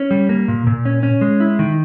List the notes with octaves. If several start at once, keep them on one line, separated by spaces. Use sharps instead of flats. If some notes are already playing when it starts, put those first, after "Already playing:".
Already playing: C#4
G3
A#3
A#2
A#2
C#4
C#4
G#3
E4
D#3